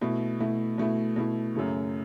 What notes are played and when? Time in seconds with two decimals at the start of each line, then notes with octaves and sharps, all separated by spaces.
0.01 B2 A3 E4
0.40 B2 A3 E4
0.78 B2 A3 E4
1.16 B2 A3 E4
1.55 F#2 C#3 F#3 A3